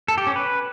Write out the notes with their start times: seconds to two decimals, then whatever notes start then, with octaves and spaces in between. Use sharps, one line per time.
0.08 A4
0.18 G4
0.27 C#4
0.36 B4